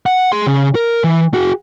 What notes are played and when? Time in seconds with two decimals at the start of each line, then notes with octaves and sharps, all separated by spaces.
0.06 F#5
0.32 G#4 C6
0.47 C#3
0.75 A#4
1.04 E3
1.34 F#4 G#4